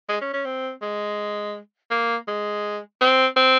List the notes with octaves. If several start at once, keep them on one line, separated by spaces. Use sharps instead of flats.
G#3
C#4
C#4
C4
G#3
A#3
G#3
C4
C4